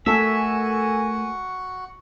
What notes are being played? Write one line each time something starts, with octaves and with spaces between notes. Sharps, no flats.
A3 F#4 A4 A#4 E5 F#5 G#5